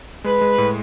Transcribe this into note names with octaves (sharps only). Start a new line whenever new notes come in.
G#3 B4
G#3
A2